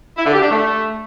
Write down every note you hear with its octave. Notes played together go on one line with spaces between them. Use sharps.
E4
D3
G4
D4
A3